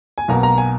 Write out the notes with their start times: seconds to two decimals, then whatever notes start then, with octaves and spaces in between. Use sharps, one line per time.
0.18 G#5
0.28 B1 B2 A#3 A#5
0.43 A#5
0.58 G#5